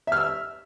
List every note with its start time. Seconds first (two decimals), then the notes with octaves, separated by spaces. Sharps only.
0.07 E5
0.12 F6
0.17 E6